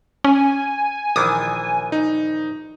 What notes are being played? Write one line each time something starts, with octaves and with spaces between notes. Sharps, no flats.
C#4 G#5
A#1 D#3 E3 D6 D#6
D#4